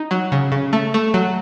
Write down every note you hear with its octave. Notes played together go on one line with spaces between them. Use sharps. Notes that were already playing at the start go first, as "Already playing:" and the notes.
Already playing: D#4
F#3
C#3
C#3
A3
A3
F#3